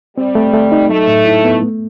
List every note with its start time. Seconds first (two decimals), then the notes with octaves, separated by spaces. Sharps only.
0.17 G3 C4
0.35 A3
0.54 A3
0.72 D#4
0.89 F#3 A3
1.08 A2
1.25 E4
1.44 B3
1.62 A3